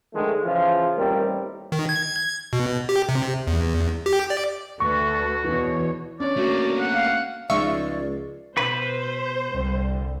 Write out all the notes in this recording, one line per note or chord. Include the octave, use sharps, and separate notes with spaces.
D3 D#3 F3 G#3 A3
C#3 E3 F3 F4
A1 D#2 G3 A3 C4 A#4
D#3
G#6
B2
G4
C3
E2
G4
D5
D2 F#4 A4 B4 C#6
E2 B2 E3 C#5
C#4 D4 C#5 D5
A3 A#3 F#4
F#5
F5
C#2 F3 G#3 D#4 D5 E5 F5 C#6
B2 B4 C5
C2 D3 G3